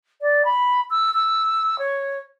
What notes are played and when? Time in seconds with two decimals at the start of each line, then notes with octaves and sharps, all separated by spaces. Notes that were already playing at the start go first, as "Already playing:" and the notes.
0.21 D5
0.45 B5
0.90 E6
1.14 E6
1.79 C#5